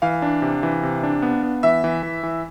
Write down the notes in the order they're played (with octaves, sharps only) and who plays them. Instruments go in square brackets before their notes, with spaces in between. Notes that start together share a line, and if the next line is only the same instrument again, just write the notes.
[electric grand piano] E3 [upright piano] F5
[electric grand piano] D4
C3
E3
C3
D4
B3
B3
[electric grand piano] E3 [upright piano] E5
[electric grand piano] E3
E3
E3